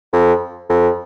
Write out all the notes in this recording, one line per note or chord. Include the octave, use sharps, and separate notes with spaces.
F2
F2